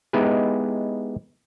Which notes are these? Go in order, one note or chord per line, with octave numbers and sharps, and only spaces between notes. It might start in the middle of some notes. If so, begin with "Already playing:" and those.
G#3 B3 D#4 E4 G4 G#4